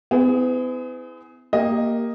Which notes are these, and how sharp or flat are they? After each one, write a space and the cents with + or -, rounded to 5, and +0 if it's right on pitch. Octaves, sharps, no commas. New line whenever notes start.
B3 +45 E4 -15 G#4 +0
A#3 +0 G4 +0 D#5 +0